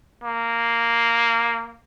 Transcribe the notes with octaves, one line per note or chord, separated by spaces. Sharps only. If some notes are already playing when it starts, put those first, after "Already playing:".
A#3